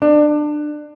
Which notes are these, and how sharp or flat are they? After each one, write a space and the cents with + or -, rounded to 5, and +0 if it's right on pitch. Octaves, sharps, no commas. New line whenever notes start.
D4 +25